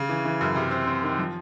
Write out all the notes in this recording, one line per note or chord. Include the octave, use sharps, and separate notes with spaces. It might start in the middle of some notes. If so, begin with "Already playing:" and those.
Already playing: C#3
E3
E3
F#2
C3
C4
C4
D#3
F3